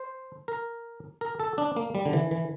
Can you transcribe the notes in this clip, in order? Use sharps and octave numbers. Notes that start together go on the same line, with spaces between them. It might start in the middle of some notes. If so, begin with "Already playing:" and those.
Already playing: C5
A#4
A#4
A4
D4
A#3
G3
D3
E3
E3